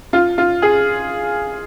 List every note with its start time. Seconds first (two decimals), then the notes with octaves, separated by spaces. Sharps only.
0.13 F4
0.38 F4
0.62 G#4